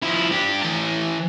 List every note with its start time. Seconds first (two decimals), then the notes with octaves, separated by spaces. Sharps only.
0.03 F3 E4
0.31 D4 G4
0.63 E3 A5